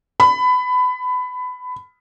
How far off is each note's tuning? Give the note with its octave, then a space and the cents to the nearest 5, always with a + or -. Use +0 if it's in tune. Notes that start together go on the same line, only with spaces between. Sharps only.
B5 +20